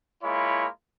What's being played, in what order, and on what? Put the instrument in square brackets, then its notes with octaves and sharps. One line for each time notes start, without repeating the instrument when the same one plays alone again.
[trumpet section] G#3 A#3 E4 F4 C#5 B5